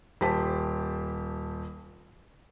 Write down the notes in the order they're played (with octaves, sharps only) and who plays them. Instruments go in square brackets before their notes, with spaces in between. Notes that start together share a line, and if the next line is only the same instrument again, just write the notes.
[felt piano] D#1 G4 C5 A5 B6